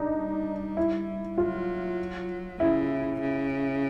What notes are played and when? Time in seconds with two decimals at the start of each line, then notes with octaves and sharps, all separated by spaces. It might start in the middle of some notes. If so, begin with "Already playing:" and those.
Already playing: D4 D#4
0.16 G3
0.77 E4
1.38 F#3 F4
2.59 C#3 E4
3.20 C#3